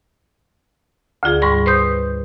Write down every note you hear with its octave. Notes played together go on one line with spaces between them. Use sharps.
D2 D3 F4 G#4
G#2 G3 B5 C#6
B4 C5 C6 D#6 G6